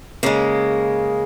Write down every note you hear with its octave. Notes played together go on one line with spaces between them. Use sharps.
C#3 G#3 A#3